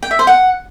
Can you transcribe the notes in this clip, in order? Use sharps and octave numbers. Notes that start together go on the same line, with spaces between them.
G5
E5
C5
F#5